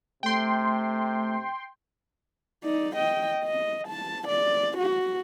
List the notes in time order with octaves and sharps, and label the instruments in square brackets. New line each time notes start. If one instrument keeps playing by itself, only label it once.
[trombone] C3 [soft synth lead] A3 [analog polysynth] G5 C6
[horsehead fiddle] D#4 D5
D#5 G5
D#5
A5
D5
F#4